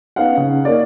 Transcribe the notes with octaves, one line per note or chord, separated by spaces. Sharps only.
B3 C#4 D#4 F5 F#5
C#3
A#3 D#4 C#5 D5